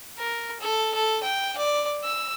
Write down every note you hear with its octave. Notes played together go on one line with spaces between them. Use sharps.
A#4
A4
A4
G5
D5
E6